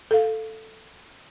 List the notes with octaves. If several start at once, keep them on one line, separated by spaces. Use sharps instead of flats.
A4 F5